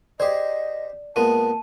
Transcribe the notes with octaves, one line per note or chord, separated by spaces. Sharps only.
G4 G#4 C5 D5 D#5
A#2 G#3 B3 A5 D#7